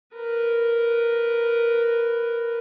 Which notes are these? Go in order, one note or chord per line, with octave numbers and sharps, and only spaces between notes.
A#4 B4